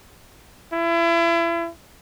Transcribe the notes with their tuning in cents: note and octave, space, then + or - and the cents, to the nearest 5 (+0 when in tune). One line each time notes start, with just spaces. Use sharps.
E4 +35